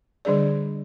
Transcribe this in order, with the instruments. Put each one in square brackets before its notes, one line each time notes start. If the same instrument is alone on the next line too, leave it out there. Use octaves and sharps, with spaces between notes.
[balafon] D3 G3 D4 G#4 D5